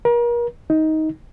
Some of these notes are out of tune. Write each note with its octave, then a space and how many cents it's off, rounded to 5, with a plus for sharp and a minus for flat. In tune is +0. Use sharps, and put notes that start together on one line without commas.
A#4 +35
D#4 +15